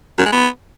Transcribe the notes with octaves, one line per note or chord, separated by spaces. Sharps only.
F#2
G#3
B3